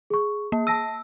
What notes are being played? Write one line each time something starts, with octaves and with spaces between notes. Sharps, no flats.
G#4 C#6
A#3
A5 E6 A#6 D#7